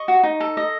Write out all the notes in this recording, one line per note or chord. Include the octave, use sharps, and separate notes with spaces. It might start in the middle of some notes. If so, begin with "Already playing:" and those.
Already playing: D#5 C#6
F#4
D#4
A4
D#5